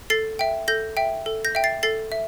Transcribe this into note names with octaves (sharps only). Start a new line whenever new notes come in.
A4 A6 C7
E5 G5
A4 G6 A#6
E5 G5
A4
G6 A#6
E5 G5
A6 C7
A4 A6 C7
E5